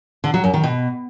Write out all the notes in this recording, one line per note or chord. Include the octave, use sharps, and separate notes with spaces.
D3
F#3
F#2
D#3
B2